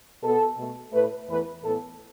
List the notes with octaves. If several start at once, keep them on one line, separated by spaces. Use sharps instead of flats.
B2 B3 A4
B2 A3
A2 A3 B4
E2 E3 A3 B4
A2 E3 B3 A4